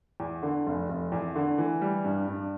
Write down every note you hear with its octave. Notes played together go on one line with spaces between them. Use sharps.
E2
D3
F1
F1
E2
D3
E3
G3
G2
G2